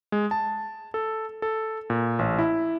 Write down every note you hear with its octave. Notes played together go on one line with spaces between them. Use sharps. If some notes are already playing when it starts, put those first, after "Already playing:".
G#3
A5
A4
A4
A#2
A1
E4